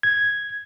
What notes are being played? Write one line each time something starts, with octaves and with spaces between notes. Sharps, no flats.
G#6